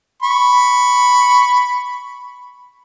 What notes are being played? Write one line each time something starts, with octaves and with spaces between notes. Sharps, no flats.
B5 C#6